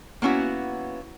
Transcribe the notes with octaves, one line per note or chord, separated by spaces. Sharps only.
A#3 B3 C#4 E4 F#4